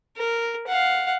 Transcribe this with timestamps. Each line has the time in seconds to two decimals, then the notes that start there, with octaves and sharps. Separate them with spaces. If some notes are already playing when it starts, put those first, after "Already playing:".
0.17 A#4
0.67 F5 F#5